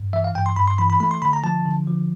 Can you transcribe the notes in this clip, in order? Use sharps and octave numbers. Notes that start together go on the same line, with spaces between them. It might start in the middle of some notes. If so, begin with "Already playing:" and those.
Already playing: G2
E3 E5
F5
G2 G5
C6
G2 B5
C6
E3 B5
B5
A3 B5
C6
D3 B5
A#5
F3 A5
D3
F3